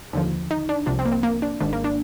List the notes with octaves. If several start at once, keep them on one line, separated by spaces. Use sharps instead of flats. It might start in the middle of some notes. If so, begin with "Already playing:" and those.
D#2 D3 F3
D#4
D4
C2 C3 F3 D4
C4
A#3
C4
A#3
D4
G#1 G#2 D#3 D4
A#3
D4